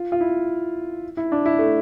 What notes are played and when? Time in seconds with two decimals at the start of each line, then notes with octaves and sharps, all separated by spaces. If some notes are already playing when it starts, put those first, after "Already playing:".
Already playing: F4
0.12 F4
0.21 E4
1.17 E4
1.32 D4
1.46 E4
1.59 A3